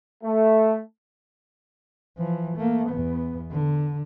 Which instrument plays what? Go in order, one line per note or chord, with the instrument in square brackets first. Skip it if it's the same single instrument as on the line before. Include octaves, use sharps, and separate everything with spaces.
[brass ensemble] A3
[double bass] E3 F3
A3 A#3
E2 B3
D3